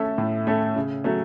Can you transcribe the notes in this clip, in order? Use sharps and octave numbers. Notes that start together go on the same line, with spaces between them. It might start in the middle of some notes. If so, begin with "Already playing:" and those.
Already playing: A3 C#4 A4 E5
A2
A3 C#4 A4 E5
C#3
F#3 A3 C#4